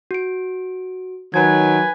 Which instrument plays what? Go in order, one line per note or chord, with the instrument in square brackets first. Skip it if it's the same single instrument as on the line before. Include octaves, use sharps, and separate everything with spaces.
[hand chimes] F#4 D7
[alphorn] D#3 [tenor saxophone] F#3 [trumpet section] B4 G#5 [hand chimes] G#6